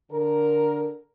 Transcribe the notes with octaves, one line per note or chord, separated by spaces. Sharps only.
D3 A#4